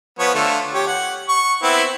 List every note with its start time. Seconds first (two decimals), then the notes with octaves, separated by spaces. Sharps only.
0.19 F3 B3 C#5
0.35 D3 A3 F4
0.73 G4 C#5
0.87 F#5
1.29 C#6
1.63 B3 C4 E4